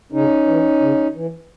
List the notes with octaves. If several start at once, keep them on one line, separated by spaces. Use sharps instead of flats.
C#3 C#4 D#4
E3
C#3
E3